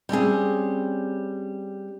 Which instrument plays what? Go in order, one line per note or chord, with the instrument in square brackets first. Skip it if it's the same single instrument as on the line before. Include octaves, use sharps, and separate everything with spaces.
[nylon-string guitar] G3 C4 C#4 G#4